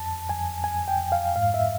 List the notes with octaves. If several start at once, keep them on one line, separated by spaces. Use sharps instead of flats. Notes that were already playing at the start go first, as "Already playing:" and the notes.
Already playing: F2 A5
F2 G#5
F2 G#5
G5
F2
F5
G#2 F5
E5